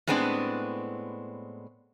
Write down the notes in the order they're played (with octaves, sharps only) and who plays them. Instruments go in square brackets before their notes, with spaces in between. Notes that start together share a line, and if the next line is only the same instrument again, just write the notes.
[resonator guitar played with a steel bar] A2 G#3 B3 C4 D4